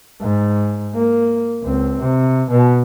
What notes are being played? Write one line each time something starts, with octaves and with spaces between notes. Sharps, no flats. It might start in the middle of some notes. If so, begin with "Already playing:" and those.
G#2
A#3
C#2 C4
C3
B2